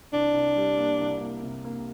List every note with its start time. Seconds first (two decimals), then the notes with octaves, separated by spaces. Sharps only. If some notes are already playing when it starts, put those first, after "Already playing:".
0.13 C2 D4
0.34 C2
0.56 G3
0.78 A#3
1.00 C2
1.20 A#3
1.43 C3
1.65 A#3